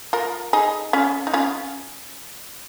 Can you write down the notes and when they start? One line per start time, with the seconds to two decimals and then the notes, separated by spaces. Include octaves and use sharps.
0.13 F4 A#4
0.53 D#4 G#4
0.93 C#4 F4
1.27 D#4
1.34 C#4 F4